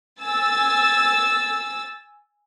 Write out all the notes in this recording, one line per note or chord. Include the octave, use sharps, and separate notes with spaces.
G#5 E6 A6